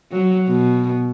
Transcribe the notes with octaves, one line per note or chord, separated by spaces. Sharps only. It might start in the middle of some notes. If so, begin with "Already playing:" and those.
F#3
B2